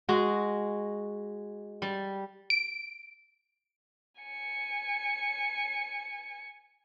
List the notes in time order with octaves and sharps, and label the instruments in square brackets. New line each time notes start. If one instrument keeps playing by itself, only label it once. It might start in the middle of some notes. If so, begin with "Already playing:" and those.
[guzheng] G#3 F#4 G#4
G3
[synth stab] D7
[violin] G#5 C#7